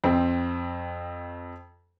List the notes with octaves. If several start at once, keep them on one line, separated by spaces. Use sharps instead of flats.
F2 C4